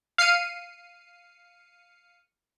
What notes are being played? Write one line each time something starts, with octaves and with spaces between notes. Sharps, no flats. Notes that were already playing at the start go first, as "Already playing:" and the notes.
F5 C7 C#7 D#7